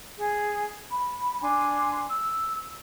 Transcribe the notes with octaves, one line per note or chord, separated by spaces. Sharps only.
G#4
B5
D4 G#5 C6
E6